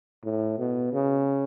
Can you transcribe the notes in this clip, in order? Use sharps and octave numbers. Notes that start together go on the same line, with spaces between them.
A2
B2
C#3